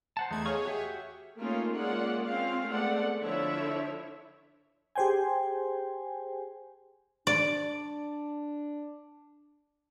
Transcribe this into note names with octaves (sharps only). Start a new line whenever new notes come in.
C5 F#5 A5
E2 A3 D#4 G#6
G#4 C#5 D#5 F5 C#6
F#4 G4 E5
A3 A#3 C#4 D#4 F4 A#4
G#3 A#3 C#4 F4 D5 F#5
C4 C#4 F4 F5
G#3 A3 B3 C4 D5 F#5
D3 F3 D4 E4 C#5 E5
G4 G#4 C5 G5 G#5
D4 D5